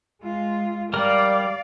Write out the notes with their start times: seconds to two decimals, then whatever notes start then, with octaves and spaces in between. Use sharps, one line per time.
0.22 G#3 F4
0.94 G3 A#4 D5 F5 F6